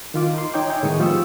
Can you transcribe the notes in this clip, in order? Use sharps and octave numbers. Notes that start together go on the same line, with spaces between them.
D#3 F4 D6
D#4 C6
D#4 C#5 G5 D6
C#5 E5 G5 G#5
A2 D#3 G#3 B3 C#6 D#6
F3 F4 G4 C#6 E6